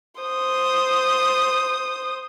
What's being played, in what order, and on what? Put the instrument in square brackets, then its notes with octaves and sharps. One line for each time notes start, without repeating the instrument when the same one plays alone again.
[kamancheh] C5 D#6